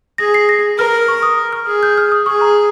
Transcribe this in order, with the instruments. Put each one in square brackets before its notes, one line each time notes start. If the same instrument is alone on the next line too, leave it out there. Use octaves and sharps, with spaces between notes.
[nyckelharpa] G#4 [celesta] A#6
[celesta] C7
A#6
[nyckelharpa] A#4 [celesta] F6
[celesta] C#6
D#6
F6
[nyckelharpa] G#4
[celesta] G6
F6
D#6
[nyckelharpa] G#4 [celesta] C#6
[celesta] A#5